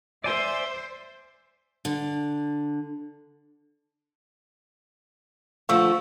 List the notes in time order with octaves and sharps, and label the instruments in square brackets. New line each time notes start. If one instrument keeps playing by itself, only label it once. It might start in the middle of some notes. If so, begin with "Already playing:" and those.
[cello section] C5 [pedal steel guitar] D5 G#5 C6 [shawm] E5
[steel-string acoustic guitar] D3
[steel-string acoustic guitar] D3 F3 A3 [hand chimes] F5 C#6 E6